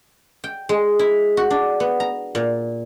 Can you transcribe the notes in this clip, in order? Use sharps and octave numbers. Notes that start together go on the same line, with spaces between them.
G5
G#3
E4
F#4
D4
B3
A#5
A#2